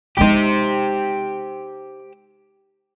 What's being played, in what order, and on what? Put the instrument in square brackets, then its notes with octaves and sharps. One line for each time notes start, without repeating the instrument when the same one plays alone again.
[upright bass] G#3 D#4 [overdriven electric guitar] G4 C5